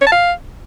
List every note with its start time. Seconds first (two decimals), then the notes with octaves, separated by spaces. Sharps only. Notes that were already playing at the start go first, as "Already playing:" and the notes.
0.01 C#5
0.07 A5
0.12 F5